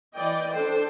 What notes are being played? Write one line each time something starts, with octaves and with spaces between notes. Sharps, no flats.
E3 D5 D#5 G5
D4 A4 C5 G5